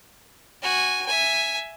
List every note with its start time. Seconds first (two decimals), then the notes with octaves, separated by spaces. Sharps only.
0.62 F#4 G#5
1.06 E5 G#5